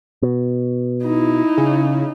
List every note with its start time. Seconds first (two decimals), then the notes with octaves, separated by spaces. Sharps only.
0.22 B2
1.03 D#4 E4
1.57 C#3